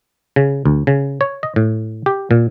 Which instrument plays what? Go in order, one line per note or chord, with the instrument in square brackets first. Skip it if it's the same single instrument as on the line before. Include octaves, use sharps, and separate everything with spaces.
[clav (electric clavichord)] C#3
D2
C#3
C#5
D#5
A2
G4
A#2